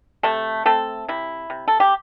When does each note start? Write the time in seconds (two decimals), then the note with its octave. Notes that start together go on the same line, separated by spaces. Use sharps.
0.23 C3 A3 A4
0.66 A3 C4 A4
1.08 C3 E4
1.50 C3
1.68 A4
1.80 G4